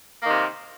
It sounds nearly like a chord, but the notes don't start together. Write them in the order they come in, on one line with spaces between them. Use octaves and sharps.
A#3 D#3 C3